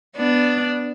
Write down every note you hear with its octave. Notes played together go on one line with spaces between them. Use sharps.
B3 D4